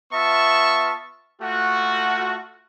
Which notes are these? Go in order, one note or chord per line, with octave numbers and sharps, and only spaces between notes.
B3 F4 E5 A5 C#6
A3 F4 F#4